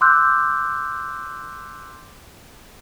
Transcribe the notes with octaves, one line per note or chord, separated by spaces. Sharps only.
C6 D6 E6 F#6 G6